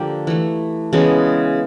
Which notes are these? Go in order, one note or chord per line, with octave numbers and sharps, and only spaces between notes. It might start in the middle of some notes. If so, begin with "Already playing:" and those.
Already playing: D3 F3 A#3 G4
E3 A3
C#3 E3 G#3 B3